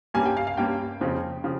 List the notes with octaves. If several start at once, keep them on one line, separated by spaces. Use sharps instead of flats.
G2 G3 A#3 C#4 G#5
G5
F5
F5
G2 G3 A#3 C#4 G5
F2 C#3 F3 C4
C#3 F3